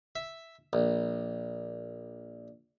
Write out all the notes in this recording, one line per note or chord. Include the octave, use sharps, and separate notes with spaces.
E5
A#1